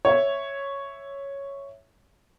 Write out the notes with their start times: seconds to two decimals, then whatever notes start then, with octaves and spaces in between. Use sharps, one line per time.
0.05 C#5 E5